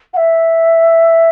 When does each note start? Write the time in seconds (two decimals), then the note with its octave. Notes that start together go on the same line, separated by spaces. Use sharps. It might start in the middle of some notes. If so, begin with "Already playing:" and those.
0.13 F#5
0.17 E5